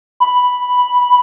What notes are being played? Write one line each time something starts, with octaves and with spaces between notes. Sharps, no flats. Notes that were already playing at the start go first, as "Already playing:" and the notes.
B5